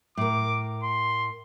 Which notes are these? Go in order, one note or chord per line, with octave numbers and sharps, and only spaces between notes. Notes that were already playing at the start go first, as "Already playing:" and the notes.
A2 A#4 D6
C6